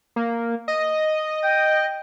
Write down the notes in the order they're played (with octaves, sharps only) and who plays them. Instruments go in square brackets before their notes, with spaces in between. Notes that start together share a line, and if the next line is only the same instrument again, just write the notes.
[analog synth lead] A#3
D#5
[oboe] G5